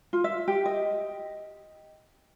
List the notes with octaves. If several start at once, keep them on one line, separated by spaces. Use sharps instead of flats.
F4
E5
G4
D#5